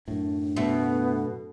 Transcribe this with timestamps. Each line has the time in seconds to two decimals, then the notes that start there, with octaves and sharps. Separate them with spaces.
0.08 F#2 A2 D4
0.56 B2 A3 B3